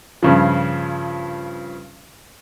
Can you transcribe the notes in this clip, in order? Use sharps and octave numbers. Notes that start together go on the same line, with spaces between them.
G2 C#3 F3